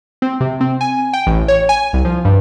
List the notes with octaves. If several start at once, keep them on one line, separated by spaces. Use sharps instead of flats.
C4
C3
C4
G#5
G5
A1
C#5
G#5
C2
F3
G2